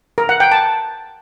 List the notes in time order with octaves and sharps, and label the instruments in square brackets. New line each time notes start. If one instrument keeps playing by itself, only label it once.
[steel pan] A#4
F#5
G5
A5